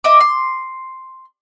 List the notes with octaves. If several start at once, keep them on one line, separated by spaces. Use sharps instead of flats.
D#5 E5 D6
C6